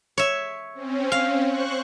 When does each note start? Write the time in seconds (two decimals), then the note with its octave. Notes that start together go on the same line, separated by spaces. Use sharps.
0.18 C#5 E5
0.74 C4 C#4
1.12 F5
1.45 C5 C#6 F#6